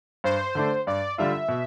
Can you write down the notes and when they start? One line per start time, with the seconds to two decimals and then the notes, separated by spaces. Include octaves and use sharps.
0.24 G2 C5
0.55 D3 A3 D4
0.87 G2 D5
1.18 D3 G3 D4 F4 E5
1.48 B2